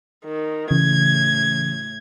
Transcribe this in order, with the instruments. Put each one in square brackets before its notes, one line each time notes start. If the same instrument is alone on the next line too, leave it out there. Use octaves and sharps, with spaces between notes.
[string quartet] D#3
[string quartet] A2 G#6 [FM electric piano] C#3 E3